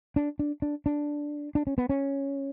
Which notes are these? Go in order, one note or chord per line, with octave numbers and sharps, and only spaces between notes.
D4
D4
D4
D4
D4
C#4
B3
C#4